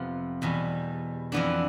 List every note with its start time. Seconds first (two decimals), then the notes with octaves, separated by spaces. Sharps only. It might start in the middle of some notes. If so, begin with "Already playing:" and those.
Already playing: F2 C3 F3 B3
0.42 E2 B2 G3
1.32 F2 E3 B3 D4